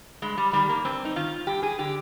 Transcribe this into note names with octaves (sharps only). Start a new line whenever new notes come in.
G2 G#3
G3
D#3 G3
A#3
G2 C4
D#4
D#3 F4
G2 G4
G#4
D3 G4